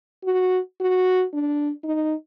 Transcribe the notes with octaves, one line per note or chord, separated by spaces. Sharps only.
F#4
F#4
D4
D#4